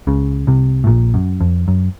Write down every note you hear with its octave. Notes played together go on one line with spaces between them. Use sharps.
C#2 C#3
C2 C3
A2
A#1 A#2
F#2
F2
F#2